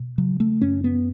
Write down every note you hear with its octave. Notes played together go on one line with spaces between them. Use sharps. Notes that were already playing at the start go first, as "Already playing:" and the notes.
Already playing: B2
C#3 F#3
A3
F#2 C#4
B3